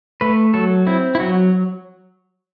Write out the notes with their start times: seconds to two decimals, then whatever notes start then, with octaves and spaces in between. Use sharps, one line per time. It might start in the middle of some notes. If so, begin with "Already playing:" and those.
0.21 A3 B4
0.54 F#3 A4
0.87 C4 E4
1.15 E4
1.20 F#3 F#4